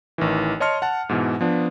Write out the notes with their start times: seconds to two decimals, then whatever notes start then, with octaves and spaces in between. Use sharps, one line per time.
0.18 A1 D#3 E3
0.60 C#5 D#5 A5 C6 F6 C#7
0.82 F#5 A5
1.09 G#2 B2 E3
1.41 F3 B3 D4